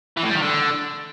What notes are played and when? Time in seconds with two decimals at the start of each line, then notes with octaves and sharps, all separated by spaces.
0.17 E3
0.23 A2
0.30 G3
0.36 D#3
0.42 D3